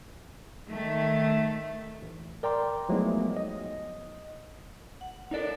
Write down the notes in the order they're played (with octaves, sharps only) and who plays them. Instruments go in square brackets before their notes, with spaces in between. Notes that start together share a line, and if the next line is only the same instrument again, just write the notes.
[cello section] D#3 A3
[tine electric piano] A1
A#4 D5 G5 A#5 C6 D6
F3 F#3 G#3 A3 B3 D#4
D#5
[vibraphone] F#5
[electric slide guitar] D#4 D5 [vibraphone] A4 A#4 C#5